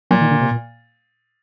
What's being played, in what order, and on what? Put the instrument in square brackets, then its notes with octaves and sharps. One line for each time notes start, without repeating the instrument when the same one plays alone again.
[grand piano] A#2 [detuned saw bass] F#3
[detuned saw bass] D#3
D3
C3
A#2